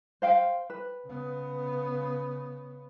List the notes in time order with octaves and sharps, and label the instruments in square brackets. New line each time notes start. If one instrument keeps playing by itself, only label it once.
[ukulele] C5 F5 G5
B4
[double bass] C#3 B3